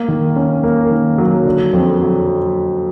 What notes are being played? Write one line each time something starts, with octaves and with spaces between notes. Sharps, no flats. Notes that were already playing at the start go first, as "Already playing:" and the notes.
Already playing: A#3
D#3
C#4
A#3
D#3
F#3
D3
F2
F#3